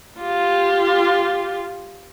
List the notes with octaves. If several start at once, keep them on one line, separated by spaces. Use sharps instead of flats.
F4 G4